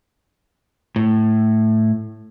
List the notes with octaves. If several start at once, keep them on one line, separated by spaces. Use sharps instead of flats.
A2